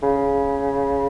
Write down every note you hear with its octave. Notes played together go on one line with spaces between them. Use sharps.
C#3